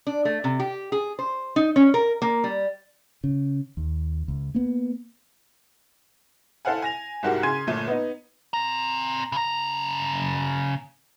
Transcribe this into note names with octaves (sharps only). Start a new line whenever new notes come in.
D4
A3
C3
G4
G#4
C5
D#4
C#4
A#4
A#3
G3
C#3
D#2
C#2
A#3 B3
E4 A4 C5 F5 F#5 G#5
G#5 A#6 F7
C2 G#2 F#4 G4 A#4 F#5
C#3 G#5 C6 G#6 D#7
G1 A#2 A3 D#7
B3 D#4
C4 A#5
C#3 A#5